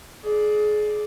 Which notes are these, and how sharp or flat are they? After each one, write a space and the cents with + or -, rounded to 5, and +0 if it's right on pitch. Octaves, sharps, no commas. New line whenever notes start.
G#4 +25 D5 +0